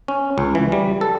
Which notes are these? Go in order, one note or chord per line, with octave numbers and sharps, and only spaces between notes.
C#4
C#2
E3
G3
A4